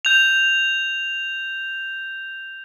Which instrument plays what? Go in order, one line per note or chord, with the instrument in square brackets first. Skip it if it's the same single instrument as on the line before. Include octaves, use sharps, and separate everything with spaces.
[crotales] G6 F7